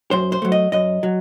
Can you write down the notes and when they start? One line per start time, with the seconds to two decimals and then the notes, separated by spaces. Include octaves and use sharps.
0.11 F#2 C5
0.32 C5
0.42 F#3 A3
0.52 D#5
0.72 F#2 D#5
1.03 F#3